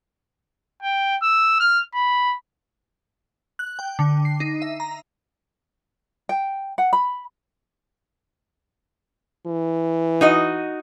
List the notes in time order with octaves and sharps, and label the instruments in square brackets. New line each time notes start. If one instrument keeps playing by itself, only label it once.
[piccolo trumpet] G5
E6
F6
B5
[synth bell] F#6
G5
D3
C7
D#4
E5
A#5
[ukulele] G5
F#5
B5
[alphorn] E3
[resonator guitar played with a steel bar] D#4 F#4 D#5